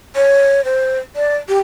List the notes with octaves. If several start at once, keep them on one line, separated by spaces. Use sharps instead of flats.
C#5
C5
D5
G4